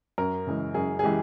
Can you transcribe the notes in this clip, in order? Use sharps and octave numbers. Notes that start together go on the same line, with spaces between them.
F#2 A#4
C#3 E3 G#3
F#2 G#4
G#4
E3 G#3 G4